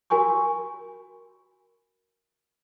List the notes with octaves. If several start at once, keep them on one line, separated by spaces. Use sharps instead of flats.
F#4 A#4 G#5 B5 C#6